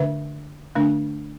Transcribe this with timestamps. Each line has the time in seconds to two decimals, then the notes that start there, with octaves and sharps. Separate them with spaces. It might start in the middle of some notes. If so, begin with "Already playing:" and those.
Already playing: D3 A3 D4 B4 E5
0.75 D3 A3 D4